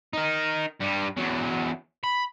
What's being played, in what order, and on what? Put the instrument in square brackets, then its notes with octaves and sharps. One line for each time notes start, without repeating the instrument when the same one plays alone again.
[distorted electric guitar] D#4 A#4
G2 G3
E2 F#3
B5